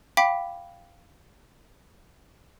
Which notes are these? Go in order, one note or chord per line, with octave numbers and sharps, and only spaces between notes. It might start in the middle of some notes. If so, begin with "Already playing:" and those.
F5 G5 B5 D6 B6